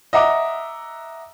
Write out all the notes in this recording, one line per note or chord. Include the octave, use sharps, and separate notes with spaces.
D#5 E5 F#5 A#5 D6